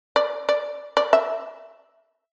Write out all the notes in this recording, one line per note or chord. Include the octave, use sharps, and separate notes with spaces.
D5
D5
D5
E5